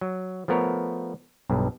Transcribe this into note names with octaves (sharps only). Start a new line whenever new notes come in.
F#3
F3 A3 B3 A#4 C#5
B1 G2